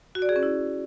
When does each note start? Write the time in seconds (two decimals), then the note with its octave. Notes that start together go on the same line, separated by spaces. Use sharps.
0.15 F#4
0.22 D5
0.29 G#4
0.36 C#4
0.43 E4